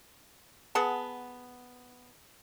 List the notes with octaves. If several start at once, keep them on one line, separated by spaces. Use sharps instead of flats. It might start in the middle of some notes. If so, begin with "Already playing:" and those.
B3 G#4 F#5 A5